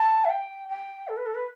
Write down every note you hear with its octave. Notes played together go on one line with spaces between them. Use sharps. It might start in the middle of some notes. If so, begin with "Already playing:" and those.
Already playing: A5
E5
G5
G5
A4
B4
A4
B4